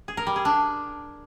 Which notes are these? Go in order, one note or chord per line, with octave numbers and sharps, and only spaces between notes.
G#4
A#4
G3
G#4
D4